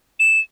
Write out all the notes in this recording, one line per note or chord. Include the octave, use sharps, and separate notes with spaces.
E7